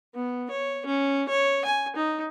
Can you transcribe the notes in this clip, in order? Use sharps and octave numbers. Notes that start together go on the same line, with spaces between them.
B3
C#5
C#4
C#5
G#5
D#4